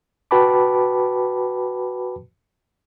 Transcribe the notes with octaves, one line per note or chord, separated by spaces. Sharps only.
F#4 B4 G5 A5 B5 D6